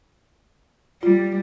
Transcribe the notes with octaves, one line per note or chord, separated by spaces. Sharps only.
G3 F4